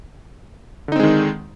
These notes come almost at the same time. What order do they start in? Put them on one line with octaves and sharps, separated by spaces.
D3 D#4 C4 G#3 D#3